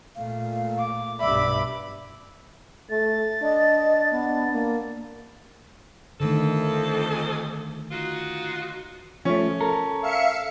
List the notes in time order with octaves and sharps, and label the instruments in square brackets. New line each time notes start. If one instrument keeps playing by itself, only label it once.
[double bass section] A#2 A3 [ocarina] F5
[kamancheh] D6
[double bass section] B1 G2 B2 [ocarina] D5 [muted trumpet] E5 [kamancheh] B5 D6
[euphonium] A3 [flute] A6
[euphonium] D4 [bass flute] D#5
[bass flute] B3
A#3
[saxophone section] F2 A4 [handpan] D3 D#3 A3
[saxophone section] D#4 F4 F#4
[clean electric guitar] F3 A3 [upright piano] C#4
[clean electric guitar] A4 A#4
[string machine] E5 F5 C#7